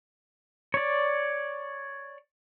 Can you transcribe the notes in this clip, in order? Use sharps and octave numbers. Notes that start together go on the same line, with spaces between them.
C#5 D5